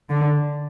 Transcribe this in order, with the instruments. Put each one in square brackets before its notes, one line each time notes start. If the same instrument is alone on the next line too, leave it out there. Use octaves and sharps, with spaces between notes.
[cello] D3